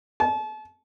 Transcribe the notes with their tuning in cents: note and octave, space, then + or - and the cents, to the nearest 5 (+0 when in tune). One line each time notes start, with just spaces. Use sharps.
A5 -35